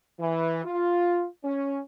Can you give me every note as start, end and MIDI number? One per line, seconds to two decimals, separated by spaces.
0.20 0.63 52
0.64 1.26 65
1.45 1.79 61